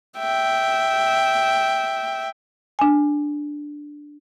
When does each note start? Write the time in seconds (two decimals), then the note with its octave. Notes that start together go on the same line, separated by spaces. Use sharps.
0.19 E5 G5
2.79 D4 G#5